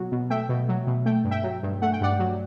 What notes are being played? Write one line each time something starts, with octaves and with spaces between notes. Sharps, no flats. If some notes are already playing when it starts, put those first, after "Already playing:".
Already playing: B2 F#3
B2
A3 E5 G5
B2
F#3
B2
A3 G5
G2
E5 G5
F#3
G2
A3 F#5
G5
G2 D5 F#5
F#3